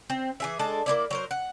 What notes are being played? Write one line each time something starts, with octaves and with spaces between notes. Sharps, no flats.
C4
E3 G#4 E5
G#3 D4 A4 A5
A#3 C4 E4 D5
F#3 A#4 C5
F#5